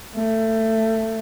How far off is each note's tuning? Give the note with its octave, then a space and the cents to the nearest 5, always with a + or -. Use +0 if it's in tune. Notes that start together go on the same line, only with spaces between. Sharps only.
A3 +20